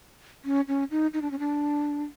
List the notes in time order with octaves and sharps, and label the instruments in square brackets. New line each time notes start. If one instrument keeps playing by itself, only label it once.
[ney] C#4
C#4
D#4
D#4
D4
C#4
D4